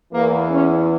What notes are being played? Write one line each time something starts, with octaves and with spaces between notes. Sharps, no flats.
E2 E3 A#3
C#4